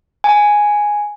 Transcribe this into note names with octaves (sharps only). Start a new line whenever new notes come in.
G#5